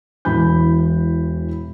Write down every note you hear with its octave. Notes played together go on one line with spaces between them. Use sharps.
E1 E3 B5 G6